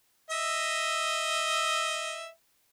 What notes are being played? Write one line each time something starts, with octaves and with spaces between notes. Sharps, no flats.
D#5 E5